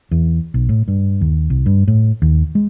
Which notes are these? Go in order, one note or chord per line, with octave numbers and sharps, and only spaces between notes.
E2
B1
A2
G2
D#2
C2
G2
A2
D#2
G#3